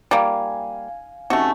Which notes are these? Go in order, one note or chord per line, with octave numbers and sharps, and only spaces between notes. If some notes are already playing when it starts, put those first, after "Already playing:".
G3 A#3 F5 G#5
C3 A3 C#4 D#4 F#4